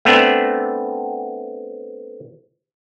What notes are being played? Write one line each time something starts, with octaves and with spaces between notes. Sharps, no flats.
A3 B3 C4 D4